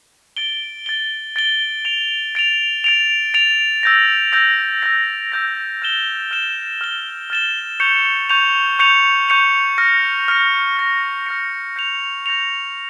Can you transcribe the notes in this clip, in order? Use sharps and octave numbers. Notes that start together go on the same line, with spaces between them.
A6 D7 G7
A6 D7 G7
A6 D7 G7
A6 D7 F7
A6 D7 F7
A6 D7 F7
A6 D7 F7
E6 G6 A#6
E6 G6 A#6
E6 G6 A#6
E6 G6 A#6
F6 A6 E7 G7
F6 A6 E7 G7
F6 A6 E7 G7
F6 A6 E7 G7
C#6 G6 C#7 F7
C#6 G6 C#7 F7
C#6 G6 C#7 F7
C#6 G6 C#7 F7
F6 A#6 C#7
F6 A#6 C#7
F6 A#6 C#7
F6 A#6 C#7
G6 A#6 C#7 F7
G6 A#6 C#7 F7